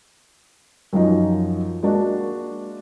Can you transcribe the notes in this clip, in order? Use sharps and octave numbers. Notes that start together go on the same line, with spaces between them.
F#2 F3 D#4
G#3 A#3 D4 F#4